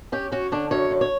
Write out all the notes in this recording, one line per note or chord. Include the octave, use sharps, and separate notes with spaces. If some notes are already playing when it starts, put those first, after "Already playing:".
C#4 G4
C#4 F#4
D3 D4
F#2 C#5
D3
C#5